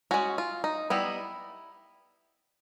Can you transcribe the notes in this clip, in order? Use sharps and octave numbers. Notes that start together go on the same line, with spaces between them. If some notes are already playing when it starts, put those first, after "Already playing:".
G#3 C#4 F#4
F4
D#4
G3 B3 D#4 E4